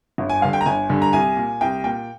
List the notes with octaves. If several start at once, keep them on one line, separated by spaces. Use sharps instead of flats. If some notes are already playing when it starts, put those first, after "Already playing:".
G1
G#5
G2 D3 F5
G5
A#5
G1 G#5
G2 D3
A#5
C2 G#5
A#2
C2 G5
A#2 G5